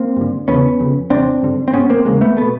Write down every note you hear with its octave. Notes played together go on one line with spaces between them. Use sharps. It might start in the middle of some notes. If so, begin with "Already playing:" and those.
Already playing: A#3 C4
G2 D3
E2 C#3 B3 C#4
F2 C#3
E2 C3 C4 D4
G2 D3
C4
G#2 B3 C#4
A#3 C4
E2 C#3 G#3 A#3
A3 B3
B2 A3 B3